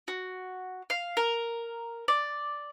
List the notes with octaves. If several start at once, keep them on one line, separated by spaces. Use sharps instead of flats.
F#4
F5
A#4
D5